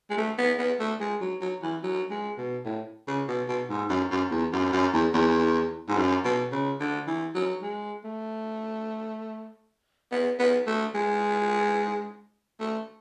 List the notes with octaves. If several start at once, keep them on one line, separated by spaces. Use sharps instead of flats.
G#3
A3
B3
B3
A3
G#3
F#3
F#3
E3
F#3
G#3
B2
A2
C#3
B2
B2
G#2
F#2
F#2
E2
F#2
F#2
E2
E2
G#2
F#2
B2
C#3
D3
E3
F#3
G#3
A3
B3
B3
A3
G#3
A3